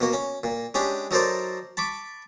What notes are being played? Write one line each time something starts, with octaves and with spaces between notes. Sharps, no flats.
B2 A#3 F#4
C#4
A#2
G#3 C#4 D4 G4
F#3 D#4 A4 A#4 C5 D5
A5 B5 C#6 D6